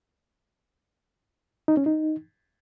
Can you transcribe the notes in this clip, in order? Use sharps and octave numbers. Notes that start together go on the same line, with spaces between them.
D#4
C#4
D#4